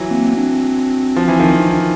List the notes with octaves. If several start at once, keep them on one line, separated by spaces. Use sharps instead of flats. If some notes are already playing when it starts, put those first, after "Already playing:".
Already playing: E3 F#3
A#3 C4
C4 D4
F3
E3
D#3 F3
D4 E4